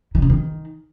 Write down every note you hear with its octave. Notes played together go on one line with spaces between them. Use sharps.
D#3
C#3
D#3